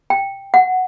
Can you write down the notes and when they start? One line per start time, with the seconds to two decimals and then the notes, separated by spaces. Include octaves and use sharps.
0.10 G5
0.54 F#5